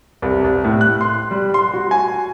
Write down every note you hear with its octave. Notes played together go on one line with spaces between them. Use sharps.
C2
C2
A2
F#6
C6
G3
C6
F#4
G#5